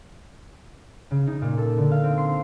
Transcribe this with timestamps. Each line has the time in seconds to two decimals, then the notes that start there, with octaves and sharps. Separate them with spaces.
1.11 C#3
1.27 D#4
1.42 A#2
1.58 A4
1.77 D3
1.91 F5
2.04 C4
2.18 C6